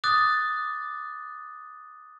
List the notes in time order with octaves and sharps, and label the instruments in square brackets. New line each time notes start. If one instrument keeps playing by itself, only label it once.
[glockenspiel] D6 D#6 F#6 A6